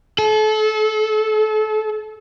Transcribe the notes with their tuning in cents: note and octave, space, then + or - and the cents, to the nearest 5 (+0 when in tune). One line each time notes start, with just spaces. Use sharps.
A4 -30